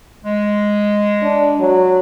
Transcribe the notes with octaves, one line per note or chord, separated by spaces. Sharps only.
G#3
D4
F#3